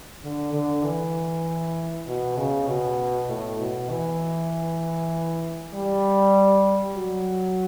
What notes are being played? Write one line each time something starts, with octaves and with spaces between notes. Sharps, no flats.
D3
D3
E3
B2
C#3
B2
A2
B2
E3
G3
F#3